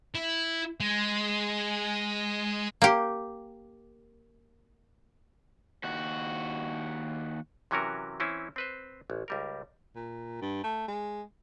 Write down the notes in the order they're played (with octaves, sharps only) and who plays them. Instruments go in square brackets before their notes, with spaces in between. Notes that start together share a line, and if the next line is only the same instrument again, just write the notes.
[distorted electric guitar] E4
G#3
[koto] A#3 G4
[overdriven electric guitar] D#2 F#4
[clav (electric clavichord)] C3 E3 F#3 C#4 F#4 A#4
E3 C4 C#4 E4
C4 B4 C5
A1
C#2 G3 A#4
[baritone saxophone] A#2
G2
A3
G#3